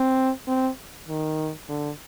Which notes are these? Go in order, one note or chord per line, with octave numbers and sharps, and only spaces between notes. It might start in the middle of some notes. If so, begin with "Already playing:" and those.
Already playing: C4
C4
D#3
D3